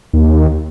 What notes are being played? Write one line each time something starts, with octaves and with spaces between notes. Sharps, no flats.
D#2